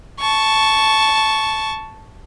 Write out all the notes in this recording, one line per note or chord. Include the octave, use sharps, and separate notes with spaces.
A5 C#6